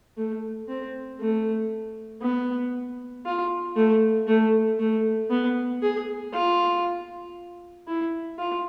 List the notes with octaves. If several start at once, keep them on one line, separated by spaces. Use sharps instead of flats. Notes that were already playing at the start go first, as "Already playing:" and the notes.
A3
C4
A3
B3
F4
A3
A3
A3
B3
G#4
F4
E4
F4